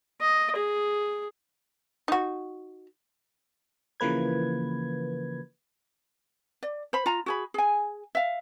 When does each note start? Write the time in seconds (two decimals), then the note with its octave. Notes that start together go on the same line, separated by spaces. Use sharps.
0.21 D#5
0.56 G#4
2.08 D#4 F#4
4.00 C#3 E3 F3 A#3 B4 G#6
6.63 D5
6.93 C5 B5
7.06 F4 A#5
7.26 F#4 G#4 B5
7.54 G#4 G#5
8.15 E5 F5